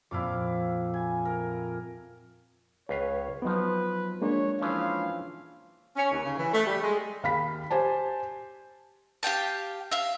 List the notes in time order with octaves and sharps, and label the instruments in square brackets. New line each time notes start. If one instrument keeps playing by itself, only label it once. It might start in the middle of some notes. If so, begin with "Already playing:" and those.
[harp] F2 A#2 [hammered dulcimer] E4 F5 D6
[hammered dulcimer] G#5
A#4
[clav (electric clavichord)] C#2 B4 F5 [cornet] C#5
[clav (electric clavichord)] F3 D#4 G5 [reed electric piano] F#3 B3 [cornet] B4
[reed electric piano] G#3 A#3 D4 [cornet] C#5
[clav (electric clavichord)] E3 F3 C#4 [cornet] F5
[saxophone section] C#4
D#2
C#3
E3
A3
G3
G#3
[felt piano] D#2 F5 B5 B6
G4 C5 G#5 A5
[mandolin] G4 F5 G5 A5
E5 F5